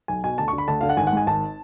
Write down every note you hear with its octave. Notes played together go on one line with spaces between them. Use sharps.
B1 G#5
B2 G#5
D2 A5
C#6
D3
B5
D2 A5
D3 F5
F#5
G#1 G#5
F#5
G#2 G#5
G#1 A5